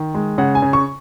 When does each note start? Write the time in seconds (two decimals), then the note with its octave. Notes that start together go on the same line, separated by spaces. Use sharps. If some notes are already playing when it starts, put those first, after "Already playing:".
Already playing: D#3
0.14 G#3
0.38 C#3 F#5
0.55 G#5
0.62 C#3
0.73 C#6